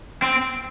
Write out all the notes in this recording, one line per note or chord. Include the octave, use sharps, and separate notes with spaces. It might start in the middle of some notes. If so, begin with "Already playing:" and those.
C4